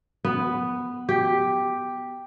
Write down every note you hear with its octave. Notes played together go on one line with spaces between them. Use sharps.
B3
G4